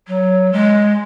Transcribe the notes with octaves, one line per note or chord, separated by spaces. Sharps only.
F#3
G#3